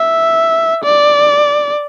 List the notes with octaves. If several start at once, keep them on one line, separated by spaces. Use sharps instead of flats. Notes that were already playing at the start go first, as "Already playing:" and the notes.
Already playing: E5
D5